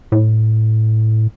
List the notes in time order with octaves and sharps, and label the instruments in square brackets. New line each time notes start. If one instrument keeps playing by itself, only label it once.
[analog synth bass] A2